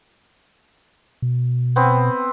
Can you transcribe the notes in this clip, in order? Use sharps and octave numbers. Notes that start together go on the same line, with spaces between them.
B2
B3 C4